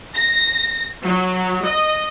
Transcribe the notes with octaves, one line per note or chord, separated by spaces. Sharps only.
A#6
F#3
D#5